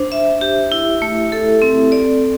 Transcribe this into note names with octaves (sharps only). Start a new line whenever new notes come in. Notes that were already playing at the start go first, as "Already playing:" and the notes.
Already playing: D4 C5
E5
G4
E4
A3
A4
C4
D5